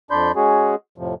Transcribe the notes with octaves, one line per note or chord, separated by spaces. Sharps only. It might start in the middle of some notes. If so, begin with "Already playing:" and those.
F2 D4 D5 B5 C6 G6
G#3 C#4 F#4 G#4
F2 A2 C3 F3